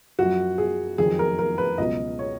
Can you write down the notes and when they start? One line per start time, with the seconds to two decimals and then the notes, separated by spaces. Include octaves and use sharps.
0.19 F#2 F3 F#4
0.58 G#4
0.98 F2 D#3 F#3 G#4
1.19 A#4
1.39 A#4
1.58 B4
1.78 C#2 B2 F#3 D#5
2.19 C#5